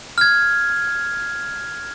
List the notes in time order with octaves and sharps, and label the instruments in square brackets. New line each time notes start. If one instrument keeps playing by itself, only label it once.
[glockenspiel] F6 G#6